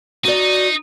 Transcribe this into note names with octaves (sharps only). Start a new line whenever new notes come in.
D#4 F#4 D5